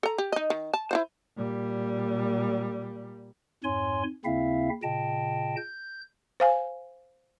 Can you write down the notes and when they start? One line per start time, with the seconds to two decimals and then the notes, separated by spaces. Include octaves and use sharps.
0.03 A4 A#5
0.18 G4
0.32 D#4 D#5
0.50 D#3
0.74 A5
0.91 E4 F4 C5
1.36 A#2 G3
3.64 F2 G#2 C#5 G#5 C6
4.25 D#2 C#3 C4 E4 E5 F5
4.83 A#2 C#3 D#5 G5 A5
5.57 G6
6.40 C5 F5 G#5